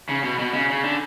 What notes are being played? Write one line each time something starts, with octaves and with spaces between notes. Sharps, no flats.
C#3
B2
B2
C#3
C#3
D3